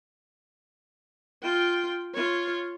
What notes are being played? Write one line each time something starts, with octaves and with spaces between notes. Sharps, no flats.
F4 G5
F4 C#5